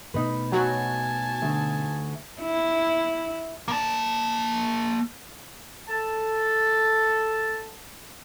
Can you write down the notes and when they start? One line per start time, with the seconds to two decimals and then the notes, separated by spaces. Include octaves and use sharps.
0.14 B2 G3 A3 D#4 B4
0.52 F#3 F#4 G#5 A5
1.42 D2
2.41 E4
3.68 A#3 A5
5.89 A4 A5